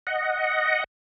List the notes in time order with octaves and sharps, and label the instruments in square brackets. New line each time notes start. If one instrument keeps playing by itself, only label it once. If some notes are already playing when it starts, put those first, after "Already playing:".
[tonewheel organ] D#5 F#5